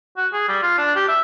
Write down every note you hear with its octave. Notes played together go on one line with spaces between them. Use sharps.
F#4
G#4
G3
F4
D4
G4
E5